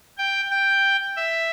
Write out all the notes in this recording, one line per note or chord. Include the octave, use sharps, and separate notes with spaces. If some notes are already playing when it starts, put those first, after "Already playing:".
G5
G5
E5